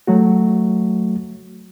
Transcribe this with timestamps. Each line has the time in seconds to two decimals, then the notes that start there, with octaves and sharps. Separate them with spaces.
0.07 F#3 A3 F#4